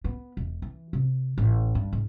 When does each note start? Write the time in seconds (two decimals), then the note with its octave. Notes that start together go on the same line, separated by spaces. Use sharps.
0.04 B3
0.37 E1
0.62 E3
0.93 C3
1.38 A1
1.75 G2
1.93 G#2